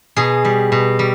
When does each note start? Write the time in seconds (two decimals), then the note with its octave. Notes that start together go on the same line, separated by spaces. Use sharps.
0.16 B2 G#4
0.45 G3
0.72 B2
0.99 G3